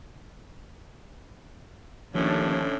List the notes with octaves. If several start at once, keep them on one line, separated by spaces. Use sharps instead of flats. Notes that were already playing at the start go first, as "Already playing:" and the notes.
D#2 A2 D3 F3 C#4 D4